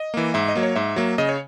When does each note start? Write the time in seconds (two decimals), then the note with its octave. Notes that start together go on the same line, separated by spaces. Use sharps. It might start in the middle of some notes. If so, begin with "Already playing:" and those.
Already playing: D#5
0.14 E3 A#3
0.34 G#2 E5
0.48 D#5
0.55 F#3 A#3
0.63 C#5
0.76 G#2 E5
0.96 F#3 A#3
1.18 C#3 D#5
1.29 C#5